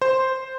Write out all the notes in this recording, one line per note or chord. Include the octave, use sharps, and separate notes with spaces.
C5